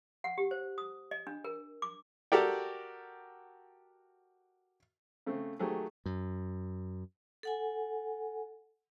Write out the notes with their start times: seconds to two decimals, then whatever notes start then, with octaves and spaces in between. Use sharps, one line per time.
0.24 F#5
0.38 G4
0.51 C5
0.78 D#6
1.11 D#5
1.27 D4
1.44 A#4
1.82 D6
2.32 F#4 G4 A4 A#4 D5 G5
5.27 C#3 A3 C4
5.59 D#3 F#3 A3 G4 G#4
6.06 F#2
7.43 A4 F#5 G#5